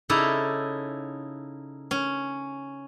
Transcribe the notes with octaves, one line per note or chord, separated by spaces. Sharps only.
C#3 D#4 E4 A4 D5 A#5
C#4